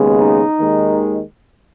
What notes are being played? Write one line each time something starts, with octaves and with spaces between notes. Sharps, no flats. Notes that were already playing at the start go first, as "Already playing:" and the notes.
Already playing: D#2 C#3 G#3 B3
D#4
D#2 D#3 G#3